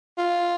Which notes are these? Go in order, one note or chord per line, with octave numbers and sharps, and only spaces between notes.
F4